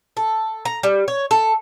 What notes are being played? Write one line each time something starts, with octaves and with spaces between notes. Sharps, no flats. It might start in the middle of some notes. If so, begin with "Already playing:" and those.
A4
A#5
G3
C#5
A4